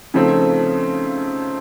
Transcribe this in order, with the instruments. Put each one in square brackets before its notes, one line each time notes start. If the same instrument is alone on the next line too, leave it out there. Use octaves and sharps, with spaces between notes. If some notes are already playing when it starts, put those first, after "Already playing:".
[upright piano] C#3 F3 A3 C4 D#4